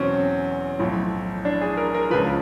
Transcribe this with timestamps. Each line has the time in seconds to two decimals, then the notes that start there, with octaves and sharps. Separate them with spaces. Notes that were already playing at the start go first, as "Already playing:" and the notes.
Already playing: E2 B2 F#3 C4 C#4
0.79 B1 A2 F3
1.45 D4
1.62 G#4
1.77 A#4
1.95 A#4
2.10 C#2 C#3 F3 B4